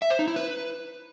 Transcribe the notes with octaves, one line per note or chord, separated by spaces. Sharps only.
E5
C5
D#4
E4
B4